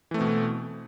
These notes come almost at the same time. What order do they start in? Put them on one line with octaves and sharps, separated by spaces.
E3 A3 C4 B2